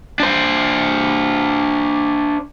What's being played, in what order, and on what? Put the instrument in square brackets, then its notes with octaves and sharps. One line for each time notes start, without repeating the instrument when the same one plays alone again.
[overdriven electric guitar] D4 C5